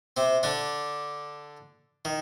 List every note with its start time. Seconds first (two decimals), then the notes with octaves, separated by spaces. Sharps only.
0.17 C3 C4
0.43 D3 D4
2.05 D#3